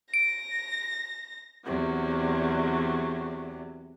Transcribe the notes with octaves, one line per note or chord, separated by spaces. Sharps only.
A#6 D7
E2 C3 F#3